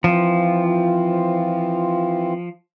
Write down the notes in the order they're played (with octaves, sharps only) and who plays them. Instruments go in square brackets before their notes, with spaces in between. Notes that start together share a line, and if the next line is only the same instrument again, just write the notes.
[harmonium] E3 C4 F4 [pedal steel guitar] F3